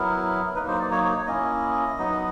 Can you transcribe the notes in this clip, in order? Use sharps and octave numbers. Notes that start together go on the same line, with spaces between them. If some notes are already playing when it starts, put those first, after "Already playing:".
Already playing: F#3 B3 E4 A#4
F#3 A#3 D#4 B4
C5
D5
C#5
C#5
A#3 C#4 E4 D#5
F#3 B3 D#4